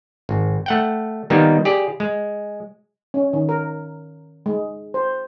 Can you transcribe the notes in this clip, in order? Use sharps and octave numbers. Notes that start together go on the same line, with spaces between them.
G#1
A3 F#5 G5
D#3 G3 A#3 B3 D#4
G4 G#4 D5
G#3
C#4
D#3
A#4
G#3
C5